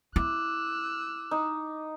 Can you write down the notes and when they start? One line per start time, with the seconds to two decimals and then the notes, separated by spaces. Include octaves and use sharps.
0.16 E4 D6 E6 F#6
1.31 D#4